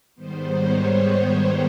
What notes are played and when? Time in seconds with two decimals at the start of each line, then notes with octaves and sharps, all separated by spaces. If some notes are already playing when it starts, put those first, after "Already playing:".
0.15 G#2 D#3 G3 B3 C5
0.53 C#5